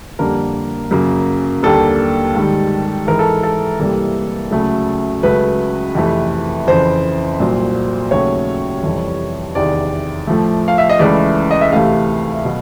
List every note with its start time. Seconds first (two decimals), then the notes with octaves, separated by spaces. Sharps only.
0.19 F2 D3 G3 A#3 A#4
0.91 F#2 C#3 F#3 A#3
1.63 D#2 D3 G3 A#3 A4
2.35 G#2 D#3 G3
3.07 G#2 E3 G#3 A#4
3.19 A4
3.43 A4
3.80 C2 C3 E3 G3 A#3
4.51 D2 C#3 F#3 A3
5.23 C#2 C#3 F#3 A3 B4
5.95 F2 C3 E3 A3
6.67 F2 C#3 E3 C5
7.40 C2 A#2 F#3
8.11 D#2 C#3 F#3 A3 C#5
8.83 F2 C3 E3 G3
9.55 E2 C3 D#3 D5
10.27 A2 F3 A3
10.68 F5
10.78 E5
10.89 D#5
10.99 C#2 C#3 E3 A3 D5
11.51 D#5
11.61 E5
11.72 D2 C3 E3 A3 F5
12.45 B2 F#3